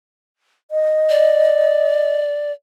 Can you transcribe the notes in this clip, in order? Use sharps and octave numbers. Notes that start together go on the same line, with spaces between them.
D#5
D5